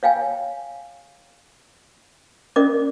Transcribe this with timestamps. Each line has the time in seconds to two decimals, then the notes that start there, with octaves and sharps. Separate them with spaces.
0.03 C#5 F5 G5 G#5
2.56 C#4 A#4 D5 D#5 D6